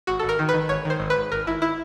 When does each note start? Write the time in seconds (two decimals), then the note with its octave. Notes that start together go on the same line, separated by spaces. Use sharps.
0.07 G#1 F#4
0.19 A4
0.23 G#1
0.29 A#4
0.39 D#3
0.49 B4
0.54 D#3
0.69 G#1 C#5
0.85 D#3 C5
1.00 G#1
1.10 B4
1.16 G#1
1.32 G#1 A#4
1.47 G#1 E4
1.62 E4